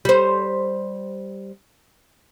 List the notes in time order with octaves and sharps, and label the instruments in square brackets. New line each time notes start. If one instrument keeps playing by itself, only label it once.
[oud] G3 C5